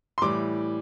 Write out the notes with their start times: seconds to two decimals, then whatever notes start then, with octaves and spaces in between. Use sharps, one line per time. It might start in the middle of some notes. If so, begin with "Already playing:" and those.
0.18 C6
0.22 A2 E3 G3 D6